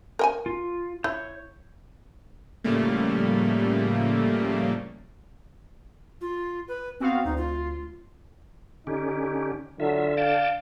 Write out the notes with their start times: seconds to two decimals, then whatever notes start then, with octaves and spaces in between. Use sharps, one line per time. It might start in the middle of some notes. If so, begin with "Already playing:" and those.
0.19 A#4 G5 G#5
0.46 F4
1.04 E4 C#5 G6
2.64 A2 C#3 F3 G3 A3 A#3
6.21 F4
6.68 B4
7.00 B3 C4 F#4 F5
7.25 D2 D#4
7.37 F4
8.87 D3 C#4 D#4 G4
9.80 D3 F#3 F4 E5
10.17 D5 F5 G5 A5